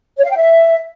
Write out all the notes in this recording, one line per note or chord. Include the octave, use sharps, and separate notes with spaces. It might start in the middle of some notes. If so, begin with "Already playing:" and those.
C#5
F5
G5
E5